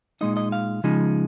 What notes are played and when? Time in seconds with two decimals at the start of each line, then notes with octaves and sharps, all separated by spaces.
0.21 A#2 G#3 D#4 D#5
0.37 D#5
0.52 F5
0.84 C#3 F3 G#3 D#4